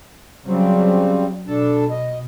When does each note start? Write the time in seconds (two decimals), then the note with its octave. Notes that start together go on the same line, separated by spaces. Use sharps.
0.46 C#3 F#3 G3 C4
1.48 B2 D4 A4 A5
1.90 D#5